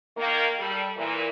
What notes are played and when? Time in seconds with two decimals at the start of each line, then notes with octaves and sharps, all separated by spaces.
0.17 D#3 A#3
0.59 G3 A4
0.97 A#2 E3